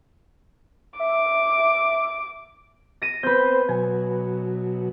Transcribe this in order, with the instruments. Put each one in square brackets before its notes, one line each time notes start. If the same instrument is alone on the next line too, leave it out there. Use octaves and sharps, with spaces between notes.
[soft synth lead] E5 [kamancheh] D6
[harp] A#6 D#7
[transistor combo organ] B3 C4 C5 [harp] B4 G6
[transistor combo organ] B2 F#3 [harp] G#5